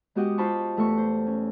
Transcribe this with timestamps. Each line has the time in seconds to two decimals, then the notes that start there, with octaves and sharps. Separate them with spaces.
0.15 G#3 B3 F#4 G4 D#5 F#5
0.38 F4 C5 A5 B5 C#6
0.77 E2 A3 A4 B4 C#6
0.97 C5
1.27 C#4